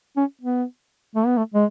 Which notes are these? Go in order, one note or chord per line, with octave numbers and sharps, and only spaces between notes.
C#4
B3
A3
B3
A3
G#3